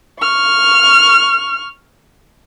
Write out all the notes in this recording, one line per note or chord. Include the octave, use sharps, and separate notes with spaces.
C#6 F6